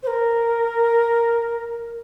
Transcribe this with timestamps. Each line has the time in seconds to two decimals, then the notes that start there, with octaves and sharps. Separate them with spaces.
0.03 C5
0.07 A#4